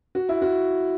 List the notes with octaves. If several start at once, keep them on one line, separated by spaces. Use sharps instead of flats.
F#4
E4
F#4